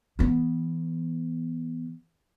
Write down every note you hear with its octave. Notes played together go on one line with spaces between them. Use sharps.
E3 B3